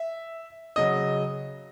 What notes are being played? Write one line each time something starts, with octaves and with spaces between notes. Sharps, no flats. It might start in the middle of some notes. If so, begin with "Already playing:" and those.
Already playing: E5
C#3 F#3 D#5